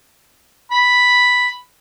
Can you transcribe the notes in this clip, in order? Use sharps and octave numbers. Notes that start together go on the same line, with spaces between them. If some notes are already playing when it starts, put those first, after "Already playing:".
B5